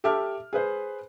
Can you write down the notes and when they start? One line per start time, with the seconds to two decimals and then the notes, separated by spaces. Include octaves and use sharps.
0.04 G4 A4 E5 A5 D6 F6
0.53 G#4 B4 C5